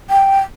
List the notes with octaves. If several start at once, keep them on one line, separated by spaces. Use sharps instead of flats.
G5